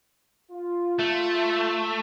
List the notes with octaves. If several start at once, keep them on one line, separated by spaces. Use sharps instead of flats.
F4
A3